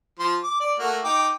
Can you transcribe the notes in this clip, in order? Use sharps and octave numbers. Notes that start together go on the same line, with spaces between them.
F3 C6
D6
D5
A3 A#3 F#4
D#4 G5 D6